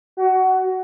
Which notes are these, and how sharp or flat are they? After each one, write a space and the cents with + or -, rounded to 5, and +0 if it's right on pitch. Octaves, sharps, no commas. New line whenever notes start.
F#4 +20